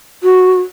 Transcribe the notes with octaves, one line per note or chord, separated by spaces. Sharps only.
F#4